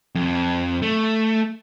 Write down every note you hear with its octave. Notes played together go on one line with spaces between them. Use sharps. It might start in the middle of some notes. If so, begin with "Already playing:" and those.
F2
A3